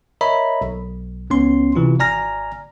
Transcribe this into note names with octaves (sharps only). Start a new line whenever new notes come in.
A#4 C#5 D#5 E5 A#5 B5
B1
C#2 B3 C#4 C6
C3 E3 F4
G#1 D5 G#5 A#5 F6 A#6